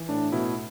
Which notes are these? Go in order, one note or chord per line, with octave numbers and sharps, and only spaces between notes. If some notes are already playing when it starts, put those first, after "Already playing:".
Already playing: E3
A2 D4
B2 E4